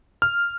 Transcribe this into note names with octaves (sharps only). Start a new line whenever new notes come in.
F6